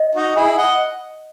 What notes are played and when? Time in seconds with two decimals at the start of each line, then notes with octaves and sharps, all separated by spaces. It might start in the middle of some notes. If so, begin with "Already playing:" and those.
Already playing: D#5
0.15 D#4 F#4
0.36 E4 G#4
0.57 D#5 F#5